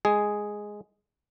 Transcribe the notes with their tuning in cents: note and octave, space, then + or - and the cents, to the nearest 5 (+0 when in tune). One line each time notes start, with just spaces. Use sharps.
G#3 +0 G#4 +0